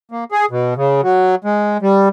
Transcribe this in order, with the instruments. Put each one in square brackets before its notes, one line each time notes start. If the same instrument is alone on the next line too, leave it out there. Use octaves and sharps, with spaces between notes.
[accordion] A#3
G#4
B2
C#3
F#3
G#3
G3